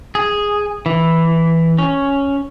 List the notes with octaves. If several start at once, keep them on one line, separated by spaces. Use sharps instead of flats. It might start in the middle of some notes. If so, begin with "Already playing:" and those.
G#4
E3
C#4